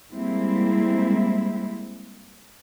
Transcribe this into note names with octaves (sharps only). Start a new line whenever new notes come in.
G3 G#3 A#3 C4 E4